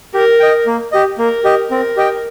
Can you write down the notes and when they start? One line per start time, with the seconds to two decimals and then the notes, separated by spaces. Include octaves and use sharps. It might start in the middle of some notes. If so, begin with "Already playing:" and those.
0.14 G4 A#4
0.40 D#5 G5
0.67 A#3
0.92 G4 D#5
1.18 A#3 A#4
1.44 G4 D#5
1.71 C4 A#4
1.97 G4 D#5 G5